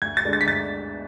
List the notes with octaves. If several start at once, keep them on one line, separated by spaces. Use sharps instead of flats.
D2 G#6
A6
D3 G#3 D4
A6
B6
D2 A6